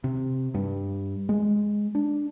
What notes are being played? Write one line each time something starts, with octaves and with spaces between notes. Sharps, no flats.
C3
G2
G#3
D4